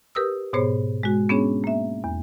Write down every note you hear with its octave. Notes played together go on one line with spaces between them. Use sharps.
G4 A#4 B4 D#6 E6
G#2 B2 B3 G#4 C5 C#5
G#3 F#4
B3 C#4 D4 G#4 C#5
A#3 E5
E2